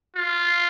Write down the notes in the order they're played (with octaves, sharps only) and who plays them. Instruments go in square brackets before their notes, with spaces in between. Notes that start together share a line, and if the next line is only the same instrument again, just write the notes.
[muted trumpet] F4